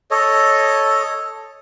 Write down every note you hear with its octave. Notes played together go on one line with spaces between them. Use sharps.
A4 C#5 D#5